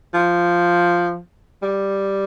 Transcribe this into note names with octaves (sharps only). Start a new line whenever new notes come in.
F3
G3